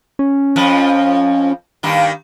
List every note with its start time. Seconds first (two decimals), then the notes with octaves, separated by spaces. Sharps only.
0.19 C#4
0.56 F2 F3
1.83 G2 D#3 A#3